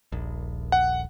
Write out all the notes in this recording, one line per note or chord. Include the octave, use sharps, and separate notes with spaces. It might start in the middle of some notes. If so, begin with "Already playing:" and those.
D#1 A#1
F#5